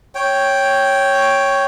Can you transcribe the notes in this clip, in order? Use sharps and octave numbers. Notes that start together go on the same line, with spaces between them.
C#5 G5